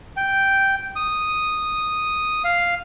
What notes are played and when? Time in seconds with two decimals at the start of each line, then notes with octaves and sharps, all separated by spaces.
0.17 G5
0.96 D#6
2.44 F5